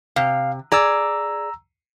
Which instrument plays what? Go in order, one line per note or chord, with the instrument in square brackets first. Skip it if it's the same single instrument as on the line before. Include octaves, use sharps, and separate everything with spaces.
[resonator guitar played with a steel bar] C3 [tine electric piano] F5
[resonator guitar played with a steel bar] G#4 D5 [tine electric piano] A#5 E6